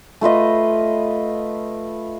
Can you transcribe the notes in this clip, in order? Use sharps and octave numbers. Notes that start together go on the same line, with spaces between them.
A3 F4 B4 D#5